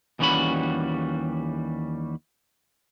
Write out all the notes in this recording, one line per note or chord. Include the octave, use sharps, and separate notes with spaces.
D#2 E3 G3 C#4 F#4 B5